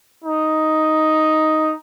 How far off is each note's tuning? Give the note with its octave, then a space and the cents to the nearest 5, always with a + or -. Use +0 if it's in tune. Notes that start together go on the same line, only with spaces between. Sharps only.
D#4 +5